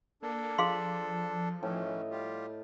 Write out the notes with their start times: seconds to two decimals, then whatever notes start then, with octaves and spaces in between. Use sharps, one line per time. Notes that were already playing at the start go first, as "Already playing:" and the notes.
0.23 A#3 D4 A4
0.58 F3 G#4 F5 C6
1.63 A2 D#3 E3 C#4 D#5
2.11 G3 F4 G4